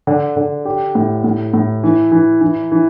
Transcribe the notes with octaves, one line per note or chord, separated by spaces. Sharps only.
D3
D3
G4
A2
A2
A2
E3
E3
E3
E3